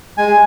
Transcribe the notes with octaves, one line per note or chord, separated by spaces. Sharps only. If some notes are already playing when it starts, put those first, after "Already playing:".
G#3 G#5